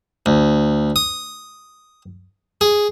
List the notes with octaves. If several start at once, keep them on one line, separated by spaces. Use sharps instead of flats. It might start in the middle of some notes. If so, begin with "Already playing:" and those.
D2
D#6
G#4